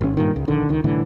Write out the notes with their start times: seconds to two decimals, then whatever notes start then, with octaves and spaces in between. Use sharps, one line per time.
0.01 G#1 C#4
0.17 G2 A#2 D#3
0.36 C#2
0.48 A#1 D3 D#3
0.69 C#2 D#3
0.84 C2 A2 D3 E3